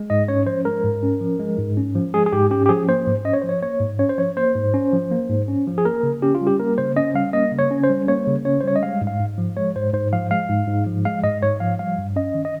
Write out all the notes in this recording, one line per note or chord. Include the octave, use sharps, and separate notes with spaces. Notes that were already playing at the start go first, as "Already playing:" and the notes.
Already playing: G#3
G#2 D#5
C#4 C#5
F3 C5
G#3 A#4
G#2
C#4
F3
G#3
G#2
C#4
F3
G#3 G#4
G#4
G#2 G4
C#4 G4
G4
F3 G#4
A#3 C5
G#2
C#4 D#5
C#5
F3 C5
C#5
A#3 C#5
G#2
C#4 C#5
C5
F3 C#5
A#3 C5
G#2
C#4
F3
A#3
G#2
C#4
F3
G#4
A#3 A#4
C#3
C#4 G4
F4
G3
G4
A#3 A#4
C#3 C5
C#4 D#5
G3 F5
A#3 D#5
C#3
C#5
C#4
C5
G3
A#3 C#5
C#3
C#4 C#5
C5
G3 C#5
D#5
G#3 F5
G#2
F5
G#2
F3
G#3 C#5
G#2 C5
G#2 C5
F3 F5
G#3 F5
G#2
G#2
F3
G#3 F5
G#2 D#5
G#2 C#5
F3 F5
G3 F5
G2
C#4 D#5
D#3
D#5